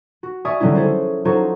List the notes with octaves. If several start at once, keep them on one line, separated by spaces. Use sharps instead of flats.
F#4
D5 E5 G#5 C#6 D#6 F6
D3 F#3 G3 C#4 E4
C#4 E4 G#4 A4 C5
F#3 D#4 F4 A4 C5 C#5